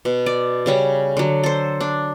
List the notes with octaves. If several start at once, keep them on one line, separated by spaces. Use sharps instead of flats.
B2
D5
C#3 G3 C#4
D3 F#3
A4 C5
D4